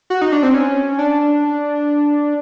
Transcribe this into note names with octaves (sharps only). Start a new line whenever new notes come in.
F#4
D#4
D4
C4
C#4
D4